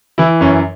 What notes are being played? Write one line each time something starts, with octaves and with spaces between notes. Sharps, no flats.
E3 E4
F#2 C#4